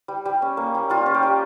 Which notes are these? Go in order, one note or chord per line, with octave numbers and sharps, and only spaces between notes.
G3
G3
C#4
A#3
G3
G3 F4
C#4
G4
G3